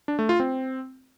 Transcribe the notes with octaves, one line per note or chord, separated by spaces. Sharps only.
D4
A3
F4
C4